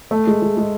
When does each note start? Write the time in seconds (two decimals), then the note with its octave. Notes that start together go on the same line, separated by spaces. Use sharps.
0.11 A3
0.27 G#3
0.42 G#3
0.57 G#3